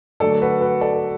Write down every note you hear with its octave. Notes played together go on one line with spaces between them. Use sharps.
D3 F#3 A3 A4 D5
F#4 B4
F#4 B4
A4 D5